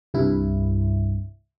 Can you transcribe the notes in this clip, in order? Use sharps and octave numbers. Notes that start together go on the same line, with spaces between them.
C2 G2 E4